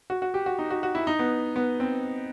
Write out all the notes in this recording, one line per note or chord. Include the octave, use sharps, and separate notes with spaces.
F#4
F#4
G4
F#4
D#4
F#4
F#4
E4
D#4
B3
B3
C4